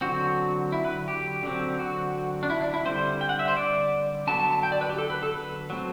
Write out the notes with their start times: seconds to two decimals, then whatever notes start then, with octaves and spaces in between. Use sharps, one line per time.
0.01 D3 F#3 C4 F#4
0.72 E4
0.85 B4
1.08 G4
1.43 D3 F#3 C4
1.79 F#4
2.43 D4
2.50 E4
2.61 D4
2.74 E4
2.85 D3 G3 C4 C5
3.21 G5
3.29 F#5
3.39 E5
3.48 C5
3.57 D5
4.27 D3 F#3 B3 A5
4.40 A5
4.51 A5
4.63 G5
4.72 D5
4.81 B4
4.90 G4
4.98 A4
5.10 B4
5.22 A4
5.34 B4
5.70 F#3 A3 C4